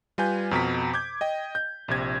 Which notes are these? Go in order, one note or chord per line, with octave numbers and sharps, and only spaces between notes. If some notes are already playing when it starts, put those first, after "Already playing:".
G3 F4 B4 G#5 G6
F2 B2 A#5 B6
D6 G6 G#6
D#5 G5
G6
A#1 C3 G#6